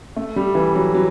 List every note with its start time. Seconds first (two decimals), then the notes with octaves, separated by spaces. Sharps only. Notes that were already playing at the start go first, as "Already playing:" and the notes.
0.16 A3
0.36 G3
0.55 E3
0.75 F#3
0.94 F#3